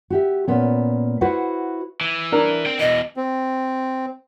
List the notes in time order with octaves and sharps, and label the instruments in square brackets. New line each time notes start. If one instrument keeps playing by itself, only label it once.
[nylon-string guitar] F#4 G4 E5
A#2 B3 C#4
E4 F#4 B4 C5 F#5
[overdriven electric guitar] E3
[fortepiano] D4 A#4
[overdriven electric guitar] C4 G5
[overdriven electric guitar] B2 E3 [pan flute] D#5
[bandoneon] C4